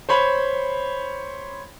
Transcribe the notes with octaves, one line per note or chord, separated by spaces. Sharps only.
C5 C#5 B5